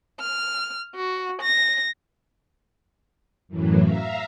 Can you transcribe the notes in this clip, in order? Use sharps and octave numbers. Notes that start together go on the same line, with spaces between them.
F6
F#4
A#6
F#2 A2 E3 F#3
E5 F5 A#5